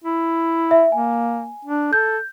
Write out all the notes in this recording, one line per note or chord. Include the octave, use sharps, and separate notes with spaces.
E4
E5
A#3 G#5
D4
A4 G6